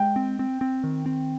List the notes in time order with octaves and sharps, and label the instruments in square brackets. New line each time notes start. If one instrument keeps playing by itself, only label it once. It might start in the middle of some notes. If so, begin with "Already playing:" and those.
Already playing: [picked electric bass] G#3 [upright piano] G5
[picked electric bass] C4
C4
C4
D#3
C4